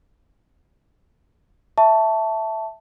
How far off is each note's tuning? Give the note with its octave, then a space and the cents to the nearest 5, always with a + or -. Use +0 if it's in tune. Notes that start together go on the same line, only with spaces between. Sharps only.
E5 +0 A5 +0 C#6 +15